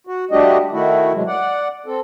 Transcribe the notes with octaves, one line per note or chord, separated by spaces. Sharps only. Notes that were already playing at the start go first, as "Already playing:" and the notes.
F#4
G3 A3 D4 F#4 G4 D#5
D#3 A3 E4 F#4
C3 F#3 G#3
D5 F#5
C4 A4